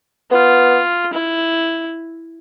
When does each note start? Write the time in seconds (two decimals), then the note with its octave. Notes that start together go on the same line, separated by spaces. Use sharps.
0.32 B3 F4
1.13 E4